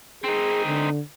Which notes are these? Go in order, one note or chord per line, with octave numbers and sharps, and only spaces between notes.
C4 D#4 G#4
D3